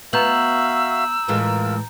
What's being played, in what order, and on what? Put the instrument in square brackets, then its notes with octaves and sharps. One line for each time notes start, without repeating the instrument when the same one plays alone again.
[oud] B3 [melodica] F#4 E5 F5 [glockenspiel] A#5 G6 F#7 [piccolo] E6
[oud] A2 E3 G#3 [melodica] F4 A#4